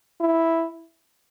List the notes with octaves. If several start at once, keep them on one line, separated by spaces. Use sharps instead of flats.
E4